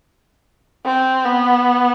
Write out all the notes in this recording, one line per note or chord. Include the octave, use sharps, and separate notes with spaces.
C4
B3